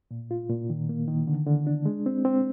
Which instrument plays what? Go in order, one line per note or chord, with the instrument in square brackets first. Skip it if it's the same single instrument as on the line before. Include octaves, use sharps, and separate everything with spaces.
[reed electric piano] A#2
F4
A#2
D#3
A#3
D#3
D3
D3
D4
G#3
C4
C4